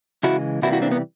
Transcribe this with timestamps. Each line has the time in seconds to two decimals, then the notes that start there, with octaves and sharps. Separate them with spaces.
0.23 C#3 E3 G#3 E4 F#4
0.62 C3 E3 G3 A#3 E4 F#4
0.72 E4 F#4
0.82 C4 D4
0.92 B3